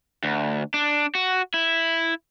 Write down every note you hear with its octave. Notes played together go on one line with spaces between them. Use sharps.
D2
D4
F#4
E4